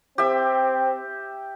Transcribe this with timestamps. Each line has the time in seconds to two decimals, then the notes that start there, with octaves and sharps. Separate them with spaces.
0.18 C4 G4 E5